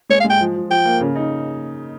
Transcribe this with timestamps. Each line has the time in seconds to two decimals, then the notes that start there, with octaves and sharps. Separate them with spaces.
0.09 G#3 C#5
0.20 F5
0.24 G#3
0.30 G5
0.41 F3
0.56 F3
0.70 F3 G5
0.85 A#3
1.01 C#3
1.16 D#4